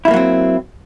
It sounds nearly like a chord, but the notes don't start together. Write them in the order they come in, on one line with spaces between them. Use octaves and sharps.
E4 G3 A#3 F#3 C4